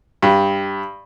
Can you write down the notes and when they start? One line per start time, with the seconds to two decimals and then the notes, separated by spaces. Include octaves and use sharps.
0.23 G2